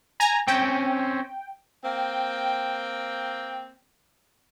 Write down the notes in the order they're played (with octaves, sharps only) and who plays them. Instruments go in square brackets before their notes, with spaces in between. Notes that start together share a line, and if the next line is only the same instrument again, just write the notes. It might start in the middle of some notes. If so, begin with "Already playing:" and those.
[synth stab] G#5 A#5
[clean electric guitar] C4 C#4 [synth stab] G5
[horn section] A#3 C4 G5